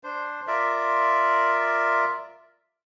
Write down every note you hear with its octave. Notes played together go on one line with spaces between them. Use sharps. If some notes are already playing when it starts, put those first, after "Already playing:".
D4 C5
F4 A#4 D5 E5